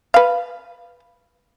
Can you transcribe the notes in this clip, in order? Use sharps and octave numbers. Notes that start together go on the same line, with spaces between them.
B4 F5